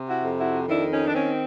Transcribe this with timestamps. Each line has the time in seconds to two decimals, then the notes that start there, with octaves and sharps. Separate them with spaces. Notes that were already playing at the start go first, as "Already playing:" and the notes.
Already playing: C3
0.08 E4 F#4
0.23 F2
0.38 E4 F#4
0.68 D#3 D4 E4
0.91 C#4 D#4
1.08 D4
1.14 C4 C#4